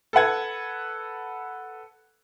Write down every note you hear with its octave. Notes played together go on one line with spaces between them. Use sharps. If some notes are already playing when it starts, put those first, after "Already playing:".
A4 B4 F#5 G#6